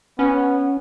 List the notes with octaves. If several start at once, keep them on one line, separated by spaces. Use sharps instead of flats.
B3 C#4